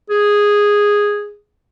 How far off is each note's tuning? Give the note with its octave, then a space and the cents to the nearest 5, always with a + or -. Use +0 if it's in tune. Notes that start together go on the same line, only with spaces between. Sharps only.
G#4 -5